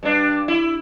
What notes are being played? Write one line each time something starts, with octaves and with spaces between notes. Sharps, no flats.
G2 D4
E4